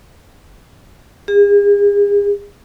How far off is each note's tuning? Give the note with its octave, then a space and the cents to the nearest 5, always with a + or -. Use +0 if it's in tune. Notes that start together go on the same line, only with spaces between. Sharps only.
G#4 -40